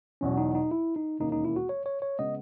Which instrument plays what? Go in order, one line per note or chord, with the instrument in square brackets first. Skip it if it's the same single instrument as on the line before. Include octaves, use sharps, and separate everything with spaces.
[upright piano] E2 B2 F#3 [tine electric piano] C#4
[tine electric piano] D#4
D#4
E4
D#4
[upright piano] E1 D#2 D#3 A#3 C#4 [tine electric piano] D#4
[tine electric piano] D#4
E4
F#4
C#5
C#5
C#5
[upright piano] C#3 G#3 B3 [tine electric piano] D#5